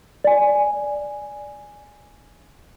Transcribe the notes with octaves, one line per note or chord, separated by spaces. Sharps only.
D5 G#5